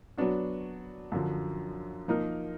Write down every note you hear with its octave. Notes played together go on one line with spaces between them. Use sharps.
F#3 B3 D4 F#4
F#2 D3 F3
F3 A#3 D#4 A#4